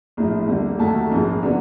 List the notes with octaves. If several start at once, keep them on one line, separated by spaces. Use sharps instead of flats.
A#1 A2 F3
D#2 D3 G3 A#3
D#2 D#3 F#3 A3 A5
A#1 G#2 F3 A#3
D3 F#3 B3